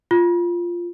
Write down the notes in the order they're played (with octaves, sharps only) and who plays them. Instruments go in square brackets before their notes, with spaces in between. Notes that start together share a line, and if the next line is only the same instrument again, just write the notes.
[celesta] F4